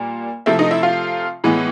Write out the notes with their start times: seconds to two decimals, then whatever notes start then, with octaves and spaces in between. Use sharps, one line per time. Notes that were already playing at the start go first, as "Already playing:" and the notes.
Already playing: A#2 G3 A#3
0.46 C3 F3 A3 C4 E4 E5
0.59 D#4 D#5
0.71 E4 E5
0.83 F4 F5
1.44 A2 E3 G#3 B3